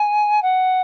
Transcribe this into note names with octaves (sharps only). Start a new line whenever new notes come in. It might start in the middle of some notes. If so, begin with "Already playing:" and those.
Already playing: G#5
F#5